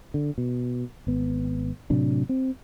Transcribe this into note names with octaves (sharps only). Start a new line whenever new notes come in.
D3
B2
G#1 B3
A2 C3 F#3 D4
C4